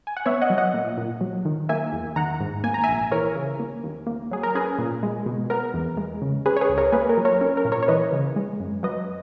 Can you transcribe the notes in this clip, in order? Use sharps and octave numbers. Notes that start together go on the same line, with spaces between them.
G#5
F#5
B3 C#5 E5
D#5 F#5
F#3
D#5 F#5
A#2
A#2
F#3
D#3
A#3 E5 G#5
E2
D#3 F#5 A#5
G#2
A#3 G#5
A#5
E5 G#5
A#1
E3 A#4 C#5
C#3
A#3
D#2
A#3
F#3 G#4
A#4
C#4 G#4 B4
A#2
G#3
B2
B3 A#4
E2
G#3
C#3
C#4 G#4 B4
C#5
G#4 B4
C#2
A#4 C#5
A#3 G#4 B4
A#4
F#3
A#4 C#5
C#4 A#4
A#4
A#2
A#4 C#5
C#5
E3 B4 D#5
C#3
G#3
F#2
F#3 B4 D#5